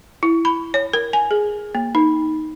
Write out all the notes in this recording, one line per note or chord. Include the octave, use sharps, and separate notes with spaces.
E4
B5
C#5
A#4
G#5
G#4
A#3
D#4